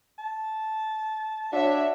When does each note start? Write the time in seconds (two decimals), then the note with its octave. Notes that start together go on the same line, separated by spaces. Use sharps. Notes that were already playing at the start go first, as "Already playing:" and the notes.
0.19 A5
1.53 D4 F#4 C#5 E5